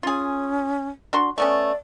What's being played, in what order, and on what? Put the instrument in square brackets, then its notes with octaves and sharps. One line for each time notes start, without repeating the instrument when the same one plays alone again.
[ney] C#4 [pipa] F4 G#4
[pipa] D4 F#4 C6
[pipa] A3 B3 C#4 [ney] D5